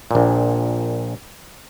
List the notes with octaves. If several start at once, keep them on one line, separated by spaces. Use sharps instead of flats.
A#1 A#2